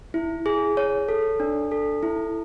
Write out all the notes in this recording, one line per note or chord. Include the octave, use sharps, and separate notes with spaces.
E4
G#4
C#5
A4
D4
A4
E4